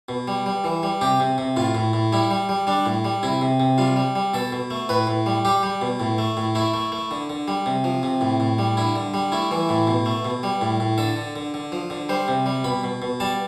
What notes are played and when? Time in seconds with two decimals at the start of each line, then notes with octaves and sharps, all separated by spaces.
0.09 B2
0.28 G3
0.46 G3
0.64 E3
0.83 G3
1.01 C3 G4
1.20 C3
1.38 C3
1.56 A2 F4
1.75 A2
1.93 A2
2.12 G3 E4
2.30 G3
2.49 G3
2.67 G3 D4
2.86 A2
3.05 G3
3.23 C3 E4
3.41 C3
3.60 C3
3.78 G3 F4
3.96 G3
4.15 G3
4.34 B2 A4
4.52 B2
4.71 A3
4.89 A2 B4
5.07 A2
5.26 G3
5.45 G3 G4
5.63 G3
5.82 B2
6.00 A2
6.18 A3
6.37 A2
6.55 A3 E4
6.74 A3
6.92 A3
7.11 D3
7.30 D3
7.48 G3
7.66 C3
7.84 F3
8.03 C3
8.21 A2
8.40 A2
8.59 G3
8.77 D3 E4
8.95 D3
9.14 G3
9.32 A3 E4
9.51 E3
9.69 A2
9.87 B2
10.06 A3
10.25 B2
10.43 G3
10.61 A2
10.80 A2
10.98 D3 A4
11.16 D3
11.36 D3
11.54 D3
11.72 F3
11.90 D3
12.09 G3 C5
12.28 C3
12.46 G3
12.64 B2 B5
12.83 B2
13.02 B2
13.20 G3 A5